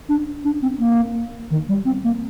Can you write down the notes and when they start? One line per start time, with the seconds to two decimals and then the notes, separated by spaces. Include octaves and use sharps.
0.09 D4
0.45 D4
0.62 C4
0.79 A#3
1.51 D#3
1.69 G3
1.85 C4
2.04 A#3